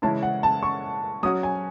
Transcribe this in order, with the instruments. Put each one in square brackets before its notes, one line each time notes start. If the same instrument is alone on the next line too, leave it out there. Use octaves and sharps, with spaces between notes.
[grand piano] C#3 E3 G#3 C#4 E4 [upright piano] A5
[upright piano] F#5
A5
C#6
[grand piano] F#3 C#4 F#4 [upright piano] D#6
[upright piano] G#5